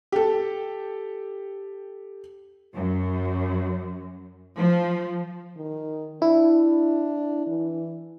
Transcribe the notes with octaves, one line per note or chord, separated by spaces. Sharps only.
G4 A4
F#2
F3
D#3
D4 E4
E3